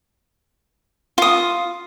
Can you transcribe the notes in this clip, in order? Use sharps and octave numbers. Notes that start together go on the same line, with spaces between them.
F4 D#6